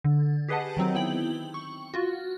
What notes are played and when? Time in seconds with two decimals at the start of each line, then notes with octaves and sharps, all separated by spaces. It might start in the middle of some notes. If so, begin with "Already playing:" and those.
0.04 D3
0.48 G4 G#4 B4 D#5 F#5 A5
0.77 D#3 F#3 C4 D#4
0.95 B3 E4 G5 F#7
1.54 C#6
1.94 F4 F#4